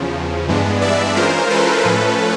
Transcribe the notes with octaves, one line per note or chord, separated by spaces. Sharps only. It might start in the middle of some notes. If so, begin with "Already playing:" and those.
Already playing: E2 C#3 F3
G2 E3 G#3 B3 D4
D5 E5
E3 G#3 C#4 F4 A#4 C5
A4 B4
A2 F3 A3 C#4